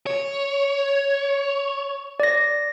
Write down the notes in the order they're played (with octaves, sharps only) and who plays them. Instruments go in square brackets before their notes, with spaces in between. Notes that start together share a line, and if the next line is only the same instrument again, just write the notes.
[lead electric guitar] C#5
[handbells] D5 A#6